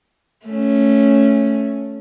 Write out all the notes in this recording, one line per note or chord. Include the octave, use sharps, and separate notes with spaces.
A3 C#4